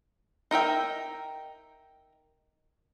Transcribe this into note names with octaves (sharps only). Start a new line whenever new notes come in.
D#4 A#4 E5 G5